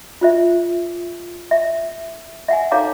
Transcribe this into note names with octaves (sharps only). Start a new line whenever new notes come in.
F4 C5 E5
E5
E5 F#5 G#5
D#4 A4 C#5 F5 A#5 D6